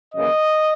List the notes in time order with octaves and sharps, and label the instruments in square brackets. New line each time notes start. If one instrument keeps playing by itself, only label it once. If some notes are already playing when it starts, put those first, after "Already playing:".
[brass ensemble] F#2 C#3 E3 A#3 D#5